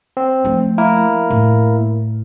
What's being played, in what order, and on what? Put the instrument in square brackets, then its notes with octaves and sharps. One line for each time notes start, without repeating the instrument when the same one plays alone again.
[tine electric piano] C4
[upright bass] F3 A3
[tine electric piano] A#3 E4 A#4
[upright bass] A2